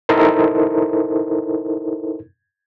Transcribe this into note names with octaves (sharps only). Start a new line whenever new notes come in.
D#4 E4 A4 A#4 C5